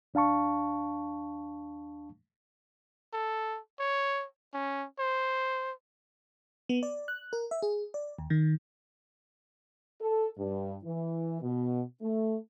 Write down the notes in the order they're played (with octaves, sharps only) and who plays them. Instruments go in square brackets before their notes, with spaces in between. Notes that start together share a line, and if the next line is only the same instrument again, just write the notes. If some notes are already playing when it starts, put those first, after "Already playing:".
[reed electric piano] D#2 D4 F5 A5 C#6
[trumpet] A4
C#5
C#4
C5
[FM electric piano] B3
D5
F#6
A#4
E5
G#4
D5
D#2
D#3
[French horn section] A4
G2
E3
B2
A3